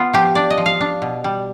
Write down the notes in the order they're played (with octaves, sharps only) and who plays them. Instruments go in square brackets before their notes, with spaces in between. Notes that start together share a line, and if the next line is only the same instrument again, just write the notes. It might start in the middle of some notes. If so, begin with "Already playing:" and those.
Already playing: [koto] B3 F4
F3 G4
D4 D5
D#5
F3
F5
D4
B2
G3